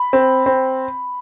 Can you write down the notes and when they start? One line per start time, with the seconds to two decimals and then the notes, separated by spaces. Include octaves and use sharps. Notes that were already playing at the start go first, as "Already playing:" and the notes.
Already playing: B5
0.13 C4
0.46 C4